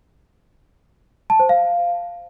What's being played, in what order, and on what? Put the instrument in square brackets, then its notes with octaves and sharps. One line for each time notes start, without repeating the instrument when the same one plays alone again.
[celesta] A5
C5
F5